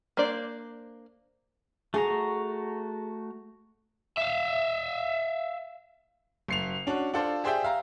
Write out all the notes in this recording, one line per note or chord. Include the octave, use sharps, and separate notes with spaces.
A#3 D4 C5 D5
A3 F#4 G#4 A#5
E5 F5
F#1 C7 F7
C#4 D4 F#4
D4 F4 A4 C5 D5
G4 G#4 C5 D5 E5 G5
E5 F5 A#5